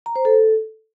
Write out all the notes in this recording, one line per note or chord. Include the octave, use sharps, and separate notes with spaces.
A#5
C5
A4